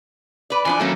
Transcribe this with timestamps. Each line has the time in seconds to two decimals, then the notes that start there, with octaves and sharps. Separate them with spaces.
0.50 B4 D5
0.65 E3 F3 D4 G#5
0.80 D#2 F#3 A3 A#3 C#4